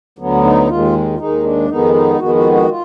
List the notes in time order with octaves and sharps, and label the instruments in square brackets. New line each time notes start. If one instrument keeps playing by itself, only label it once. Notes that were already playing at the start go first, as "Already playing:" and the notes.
[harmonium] D2 D3 F#3 B3
D#4
D#2 D#3 G#3 F4
F4
D#2 D#3 G#3 D#4
D4
F2 D#3 G#3 B3 D#4
D#4
F2 D#3 G#3 B3 F#4
F#4
F#4
F4